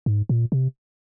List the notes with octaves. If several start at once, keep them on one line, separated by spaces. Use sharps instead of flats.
G#2
A#2
C3